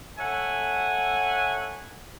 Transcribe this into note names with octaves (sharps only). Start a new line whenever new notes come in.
A4 C#5 E5 F#5 G#5